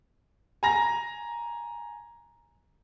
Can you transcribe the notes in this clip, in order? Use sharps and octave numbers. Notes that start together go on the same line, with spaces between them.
G#5 A#5 A#6